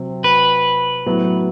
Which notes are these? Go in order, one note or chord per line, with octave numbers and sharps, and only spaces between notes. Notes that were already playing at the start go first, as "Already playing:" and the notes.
Already playing: C3 F#3 C4
B4
A2 F#3 B3